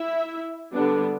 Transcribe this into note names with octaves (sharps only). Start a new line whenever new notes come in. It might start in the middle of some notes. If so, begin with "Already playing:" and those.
Already playing: E4 E5
D3 G3 B3 D4